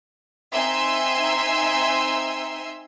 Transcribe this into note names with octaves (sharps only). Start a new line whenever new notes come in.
C4 D#4 E5 G#5 C6 E6